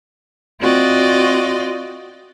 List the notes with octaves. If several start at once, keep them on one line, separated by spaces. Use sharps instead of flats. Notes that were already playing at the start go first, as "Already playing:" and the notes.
C4 F4 F#4 D5 D#5